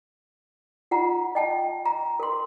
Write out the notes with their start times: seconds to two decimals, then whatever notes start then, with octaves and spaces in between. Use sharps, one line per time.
0.91 F4 F#5 A#5
1.35 D#5 G5 A5
1.85 A#5
2.20 A#4 C6